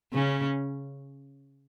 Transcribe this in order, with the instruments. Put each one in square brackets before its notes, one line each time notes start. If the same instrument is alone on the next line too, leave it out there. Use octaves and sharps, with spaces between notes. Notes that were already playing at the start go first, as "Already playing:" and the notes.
[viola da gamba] C#3 C#4